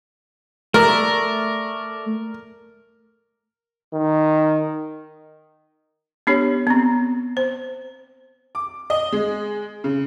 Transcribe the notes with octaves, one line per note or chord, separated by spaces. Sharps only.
A3 A#4 D5 E5
D#3
B3 D4 G4 C#5
B3 C4
C5
D6
D#5
G#3
C#3